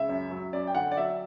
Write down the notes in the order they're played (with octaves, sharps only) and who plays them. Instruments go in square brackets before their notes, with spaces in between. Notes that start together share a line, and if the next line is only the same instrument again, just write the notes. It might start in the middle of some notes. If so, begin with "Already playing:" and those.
Already playing: [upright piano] C#2 E5
F#2
F#3
F#2 D5
G5
D3 F#5
D5
F#3 E5